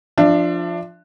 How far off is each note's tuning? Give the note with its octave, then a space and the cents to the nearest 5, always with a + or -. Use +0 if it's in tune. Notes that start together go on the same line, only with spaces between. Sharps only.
F3 +0 D4 +15 E5 +40